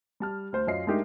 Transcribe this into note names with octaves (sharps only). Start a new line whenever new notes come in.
G3 A5 F6
D2 C5
F#2 F4 D#5 C7
G#3 A3 D4 D#4 G4 A#4